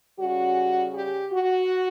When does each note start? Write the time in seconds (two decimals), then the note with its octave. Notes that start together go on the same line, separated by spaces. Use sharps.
0.19 C#3 G3 C#4 F#4
0.94 G4
1.32 F#4